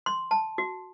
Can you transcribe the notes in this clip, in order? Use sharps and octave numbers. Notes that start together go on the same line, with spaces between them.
C6
A5
F#4